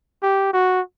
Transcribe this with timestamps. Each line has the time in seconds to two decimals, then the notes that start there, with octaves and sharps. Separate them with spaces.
0.23 G4
0.53 F#4